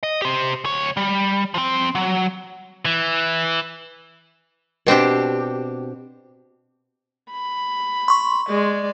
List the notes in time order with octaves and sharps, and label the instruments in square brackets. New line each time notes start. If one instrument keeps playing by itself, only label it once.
[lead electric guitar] D#5
G4 C5
D2 C#5
G3
F3 C4
F#3
[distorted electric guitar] E3
[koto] B2 C4 D4 G4
[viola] B5
[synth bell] C6 C#6
[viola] G#3 D5